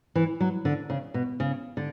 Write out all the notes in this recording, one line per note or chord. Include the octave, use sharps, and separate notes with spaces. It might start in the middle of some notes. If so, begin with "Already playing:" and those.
E3
F#3
D3
C#3
B2
C#3
D3